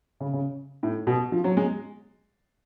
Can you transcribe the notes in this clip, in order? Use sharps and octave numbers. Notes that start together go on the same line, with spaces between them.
C#3
C#3
A2
B2
F3
F#3
G#3